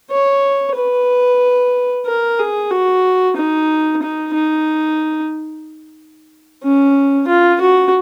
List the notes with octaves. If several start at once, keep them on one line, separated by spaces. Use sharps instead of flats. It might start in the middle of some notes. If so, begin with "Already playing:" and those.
C#5
B4
A#4
G#4
F#4
D#4
D#4
D#4
C#4
F4
F#4